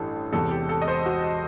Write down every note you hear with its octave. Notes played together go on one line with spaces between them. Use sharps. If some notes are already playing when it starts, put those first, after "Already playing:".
Already playing: A1 G2 E3 A4
E1 E2 C3 A4
G4
A4
D#5
C5
F#4